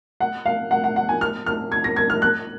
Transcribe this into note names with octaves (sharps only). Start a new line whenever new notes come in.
F#5
F5
F#5
F#5
F#5
G#5
F6
F6
G#6
A#6
G#6
F6
F#6